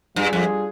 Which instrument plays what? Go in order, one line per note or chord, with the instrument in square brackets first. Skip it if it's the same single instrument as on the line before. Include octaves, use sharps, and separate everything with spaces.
[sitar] G2 [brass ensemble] G3 D4 F4 G#4
[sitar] F2